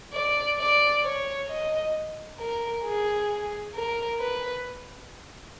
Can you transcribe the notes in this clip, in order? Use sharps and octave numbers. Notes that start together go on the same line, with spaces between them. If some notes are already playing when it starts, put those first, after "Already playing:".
D5
D5
C#5
D#5
A#4
G#4
A#4
B4